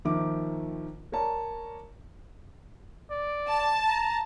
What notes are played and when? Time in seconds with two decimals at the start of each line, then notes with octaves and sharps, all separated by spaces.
0.05 D#2 D#3 F3 E5 D6
1.12 A#4 C#5 D5 A5 A#5
3.10 D5
3.49 A5
3.87 A#5